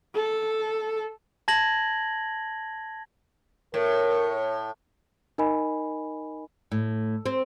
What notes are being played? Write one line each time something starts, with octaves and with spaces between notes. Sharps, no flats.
A4
A5 G#6 A#6 F#7
A2 A#4 C#5
D#4 A#4 D#5 G#5 B5
A2
C4